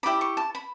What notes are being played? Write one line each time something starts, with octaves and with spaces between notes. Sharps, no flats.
E4 G4 D5 B5
C#6
A5
B5